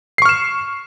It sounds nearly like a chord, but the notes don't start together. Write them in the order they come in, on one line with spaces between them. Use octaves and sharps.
C7 C#6 F6 E7